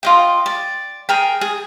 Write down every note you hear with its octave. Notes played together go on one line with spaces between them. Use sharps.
F4 D#5 G5
D5
G#4 A#4 G5
G#4